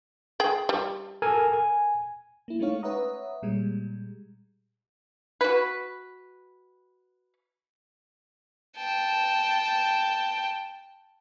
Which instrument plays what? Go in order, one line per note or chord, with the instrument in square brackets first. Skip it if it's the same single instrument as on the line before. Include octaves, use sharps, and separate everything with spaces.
[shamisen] G#4 G5
G3
[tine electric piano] A4 A#4 G#5
G#5
[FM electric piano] A#3 E4
G#3 A3 C#4 D#4 C#5 F5
B4 C#5 E5 F#5 A#5 D#6
A#2 G3 G#3
[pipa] F#4 B4
[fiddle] G5 A5